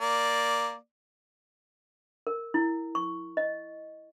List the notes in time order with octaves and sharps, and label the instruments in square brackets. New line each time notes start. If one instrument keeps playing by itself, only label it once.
[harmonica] A#3 D5
[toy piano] A#4
E4
C#6
D#5